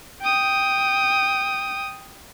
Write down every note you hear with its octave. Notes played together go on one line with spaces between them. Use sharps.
G5 D#6